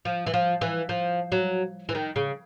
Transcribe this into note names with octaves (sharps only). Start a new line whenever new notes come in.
F3
E3
F3
E3
F3
F#3
E3
D#3
C#3